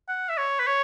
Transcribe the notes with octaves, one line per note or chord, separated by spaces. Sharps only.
F#5
E5
C#5
B4
C#5